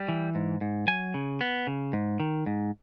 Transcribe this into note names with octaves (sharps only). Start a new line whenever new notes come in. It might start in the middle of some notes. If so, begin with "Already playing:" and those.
Already playing: G3
E3
G#2
G#2
F#3 G#5
C#3
B3
C#3
G#2
D#3
G#2